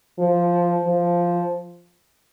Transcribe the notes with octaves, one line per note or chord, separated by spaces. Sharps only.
F3
F3